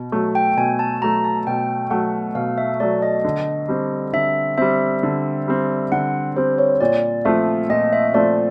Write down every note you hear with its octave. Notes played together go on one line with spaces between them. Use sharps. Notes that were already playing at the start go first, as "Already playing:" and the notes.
Already playing: B2
F#3 A3
G5
B2 G#5
A5
F#3 A3 A#5
A5
B2 G5
F#3 A3 F#5
B2 F5
E5
F#3 A3 D5
D#5
D3
G3 C4
D3 E5
G3 C4 E5
D3
G3 C4
D3 F#5
G3 C4 C5
C#5
A#2 D5
F3 A3 C4 F4 E5
A#2 D#5
E5
F3 A3 C4 F4 D5